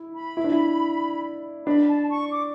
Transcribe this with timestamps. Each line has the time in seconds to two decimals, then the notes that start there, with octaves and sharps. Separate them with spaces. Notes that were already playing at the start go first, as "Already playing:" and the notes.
Already playing: E4
0.15 B5
0.37 E4
0.44 D4
0.52 E4
1.66 D4 B5
1.88 A5
2.10 C#6
2.31 D6